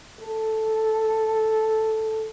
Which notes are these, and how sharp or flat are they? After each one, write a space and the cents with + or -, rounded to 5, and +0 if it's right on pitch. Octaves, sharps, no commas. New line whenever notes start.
A4 -5